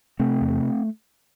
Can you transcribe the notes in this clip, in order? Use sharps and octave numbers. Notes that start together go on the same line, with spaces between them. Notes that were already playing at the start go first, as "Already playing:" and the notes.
C3 A3 C4
E2